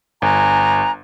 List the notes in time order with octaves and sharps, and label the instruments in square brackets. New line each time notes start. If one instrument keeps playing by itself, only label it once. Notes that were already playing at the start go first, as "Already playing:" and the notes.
[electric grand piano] G1 [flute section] G#5 A#5 F#6